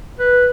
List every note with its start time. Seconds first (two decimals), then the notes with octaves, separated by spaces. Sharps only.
0.19 B4